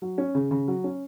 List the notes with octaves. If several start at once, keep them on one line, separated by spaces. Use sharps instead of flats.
F#3
C#4
C#3
C#3
F#3
C#4